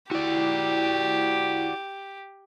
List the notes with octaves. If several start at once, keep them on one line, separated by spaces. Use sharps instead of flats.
E4 F#4 G4 D5